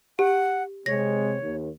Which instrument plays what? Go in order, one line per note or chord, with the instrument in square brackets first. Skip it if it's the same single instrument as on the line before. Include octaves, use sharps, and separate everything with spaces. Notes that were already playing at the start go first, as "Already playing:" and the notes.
[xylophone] G4 [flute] F#5
[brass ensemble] C3 G#3 C4 [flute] C#5 [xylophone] A#6
[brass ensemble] D#2